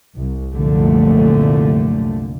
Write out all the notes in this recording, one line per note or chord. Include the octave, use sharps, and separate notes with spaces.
C2
C2 F#2 A#2 D3 F3 A3